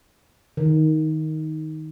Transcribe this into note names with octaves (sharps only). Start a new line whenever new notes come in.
D#3